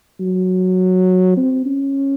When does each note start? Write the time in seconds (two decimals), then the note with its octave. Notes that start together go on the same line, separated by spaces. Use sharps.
0.20 F#3
1.37 C4
1.65 C#4